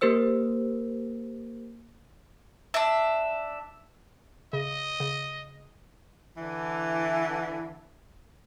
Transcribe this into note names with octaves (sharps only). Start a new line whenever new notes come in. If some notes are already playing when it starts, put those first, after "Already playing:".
A#3 G4 A#4 C5 E6
D4 E5
C#3 D#5
C#3
D3 E3